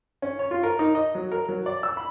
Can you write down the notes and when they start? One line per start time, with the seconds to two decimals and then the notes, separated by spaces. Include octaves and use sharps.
0.22 C#4
0.39 C#5
0.51 F4
0.63 A#4
0.79 D#4
0.95 D#5
1.15 F#3
1.32 A#4
1.49 F#3
1.66 D5
1.83 E6
1.97 B5